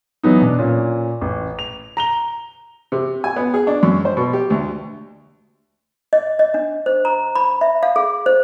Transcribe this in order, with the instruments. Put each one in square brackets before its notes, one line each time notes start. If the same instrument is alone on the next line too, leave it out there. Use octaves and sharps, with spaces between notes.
[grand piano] E3 F#3 B3 D#4
B2 D4
A#2 C#4
A1
F7
A#5 F7 G7
[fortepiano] C3
G#5
B3
G#4
D4
F#2
C5
B2
G4
D2
[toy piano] D#5
D#5
D4
C5
A#5
B5
E5
F5
G#4
C5